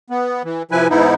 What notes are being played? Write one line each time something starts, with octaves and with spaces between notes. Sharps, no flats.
B3
E3
C3 F3 E4 B4 G#5
G#2 E3 B3 D#4 E4